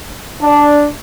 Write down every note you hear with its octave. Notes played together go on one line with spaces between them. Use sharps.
D4